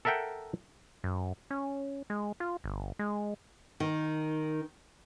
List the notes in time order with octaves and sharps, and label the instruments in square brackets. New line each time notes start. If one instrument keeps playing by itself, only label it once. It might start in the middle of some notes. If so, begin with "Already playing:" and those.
[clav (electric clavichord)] A4 A#4 E5 F#5 G5
[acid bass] F#2
C#4
G#3
F4
G1
G#3
[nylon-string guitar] D#3